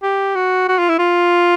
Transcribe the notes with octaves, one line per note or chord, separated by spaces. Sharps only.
G4
F#4
F#4
F4
E4
F4